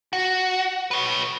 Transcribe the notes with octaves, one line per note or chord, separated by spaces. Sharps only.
F#4
B4 C#5